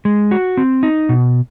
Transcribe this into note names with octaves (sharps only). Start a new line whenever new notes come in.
G#3
F#4
C4
D#4
B2